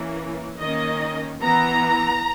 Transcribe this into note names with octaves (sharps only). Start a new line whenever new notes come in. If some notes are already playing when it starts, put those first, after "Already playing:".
Already playing: E3 A#3 C#4
D#3 A#3 C#4 D#5
E3 B3 A#5